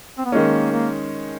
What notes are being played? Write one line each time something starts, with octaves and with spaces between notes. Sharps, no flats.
C4
B3
D#3 G#3 A#3 C#4
A#3